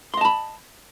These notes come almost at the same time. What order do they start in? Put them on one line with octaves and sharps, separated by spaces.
C6 D#5 A5 B5